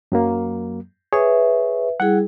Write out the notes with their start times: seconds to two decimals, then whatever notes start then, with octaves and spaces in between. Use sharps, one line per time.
0.12 F#2 F#3 A#3
1.13 G#4 B4 C#5 E5
2.00 G3 E4 G#4 F#5